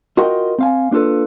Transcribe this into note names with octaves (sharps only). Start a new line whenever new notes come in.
F4 F#4 A#4 D#5 G5
C4 F5 G#5
A#3 D4 F4 A4 B4